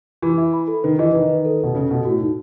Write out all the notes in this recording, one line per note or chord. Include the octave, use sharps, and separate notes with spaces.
E3 B5
E5
B5
A4
D#3 B4
E3 D#5
D#3 B4
B4
A4
B2 A4
C#3 A4
B2 A4
A2 F#4
D#4